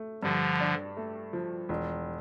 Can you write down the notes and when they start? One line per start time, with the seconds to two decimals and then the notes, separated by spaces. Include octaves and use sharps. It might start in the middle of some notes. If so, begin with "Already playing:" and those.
Already playing: A3
0.23 G2 D3 F3
0.60 D4
0.97 A3
1.33 F3
1.69 E1